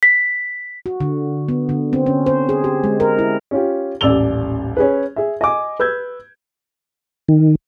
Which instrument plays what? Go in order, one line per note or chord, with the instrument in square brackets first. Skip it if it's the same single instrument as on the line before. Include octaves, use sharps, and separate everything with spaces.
[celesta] B6
[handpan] F#4
D3
B3
D3
C4
C#4
C5
G#4
G4
G#3
A#4
E4
[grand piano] C#4 F4 G4
D#1 A1 D5 E6 F7 G7
C#4 G#4 B4
G#4 E5
D#5 G#5 D6
B4 E6 G6 G#6
[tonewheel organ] D#3